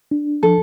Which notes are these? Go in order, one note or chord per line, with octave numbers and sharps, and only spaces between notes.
D4
F3 A4